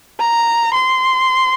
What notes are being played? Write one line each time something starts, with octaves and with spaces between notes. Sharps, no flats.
A#5
C6